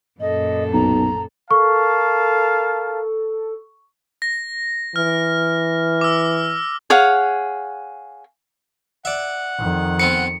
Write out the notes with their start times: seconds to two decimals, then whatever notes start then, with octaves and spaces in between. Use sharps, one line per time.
0.21 F#2 A#2 A4 D#5
0.73 B1 A#5
1.51 A4 A#4 F5 A5 C#6
4.22 A#6
4.96 E3 F6
6.01 D6 E6
6.90 G#4 C#5 F5 F#5
9.05 D5 E5 F#5
9.58 F2 D#3
9.99 B3 C4 B4 C#7